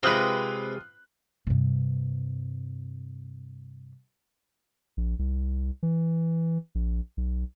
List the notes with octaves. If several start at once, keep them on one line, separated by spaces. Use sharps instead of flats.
C3 G#3 C4 F4 B4 D#6 F#6
G2 C3
A#1
C2
E3
A#1
B1